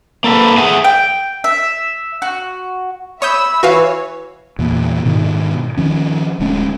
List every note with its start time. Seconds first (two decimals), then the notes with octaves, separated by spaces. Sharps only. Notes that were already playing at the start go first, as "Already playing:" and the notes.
0.24 A#3 A4 B4
0.58 G#4 E5 F#5 G#5
0.84 G5
1.44 E5
2.22 F#4
3.22 C#5 E5 B5 D#6 E6 G6
3.63 E3 F#4 B4 C#5 F5
4.59 E2 A#2
5.05 G#2 B2 D#3
5.77 D#3 F3 C#4
6.40 D1 D2 G#3 C#4